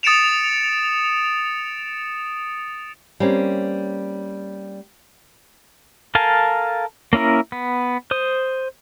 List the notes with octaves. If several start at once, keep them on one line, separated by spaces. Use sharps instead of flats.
D#6 A6 C#7 D7 E7 F7
G3 A#3 C4 C#4
A4 A#4 F5 G#5 A5
A#3 C#4 E4 A#4
B3
C5 D#6